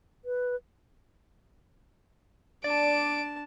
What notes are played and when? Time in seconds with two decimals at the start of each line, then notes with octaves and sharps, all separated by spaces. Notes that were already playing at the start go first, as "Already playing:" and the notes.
0.25 B4
2.64 D4 D5 A5 D7